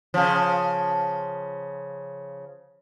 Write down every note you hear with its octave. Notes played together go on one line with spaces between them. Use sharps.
C#3 F3